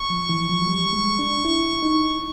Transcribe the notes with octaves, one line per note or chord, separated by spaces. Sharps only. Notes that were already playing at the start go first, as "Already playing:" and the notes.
Already playing: C#6
F3
E3
F3
F#3
G3
G#3
D4
E4
D#4